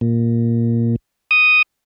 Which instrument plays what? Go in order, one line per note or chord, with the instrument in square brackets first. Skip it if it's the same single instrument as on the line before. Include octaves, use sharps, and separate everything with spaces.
[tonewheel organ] A#2
D#6